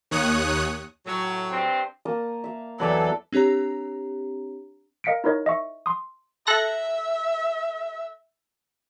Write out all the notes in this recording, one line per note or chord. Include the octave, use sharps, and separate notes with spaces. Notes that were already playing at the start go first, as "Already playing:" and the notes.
D#2 C#5 D#6 F#6
A2 F#3
G2 C4
A#3 A5 D#6
E5 F5
E2 E3 F#3 A4 B4 D5 E5
C4 D4 G4 C#5 A#5
A#4 D#5 F5 B6 C#7 D7
D#4 E4 A#4 C#5 D#5
D#5 E5 C#6
C6 D#6
A4 E5 F#6 A#6